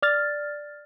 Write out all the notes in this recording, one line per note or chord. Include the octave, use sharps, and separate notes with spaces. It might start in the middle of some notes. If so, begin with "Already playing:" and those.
D5 F6 A6